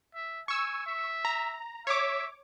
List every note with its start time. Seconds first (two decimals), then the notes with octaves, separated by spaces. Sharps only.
0.15 E5
0.48 G#5 C#6 E6
0.87 E5
1.25 A#5
1.87 C#5 E5 D6